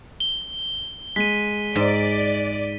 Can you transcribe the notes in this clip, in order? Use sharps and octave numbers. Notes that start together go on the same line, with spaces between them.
G7
G#3 B6 D#7
G#2 D5